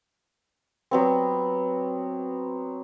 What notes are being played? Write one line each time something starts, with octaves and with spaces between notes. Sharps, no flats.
F#3 B3 C4